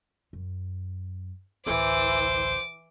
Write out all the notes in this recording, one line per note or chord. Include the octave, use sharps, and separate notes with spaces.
F#2
A1 D2 E3 C5 D6